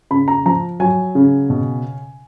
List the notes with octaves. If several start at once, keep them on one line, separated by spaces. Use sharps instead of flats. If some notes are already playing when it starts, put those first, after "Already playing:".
C#3 B5
A#5
F3 A#5
F#3 G#5
C#3
B2